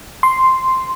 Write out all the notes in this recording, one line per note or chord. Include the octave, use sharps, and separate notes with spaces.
C6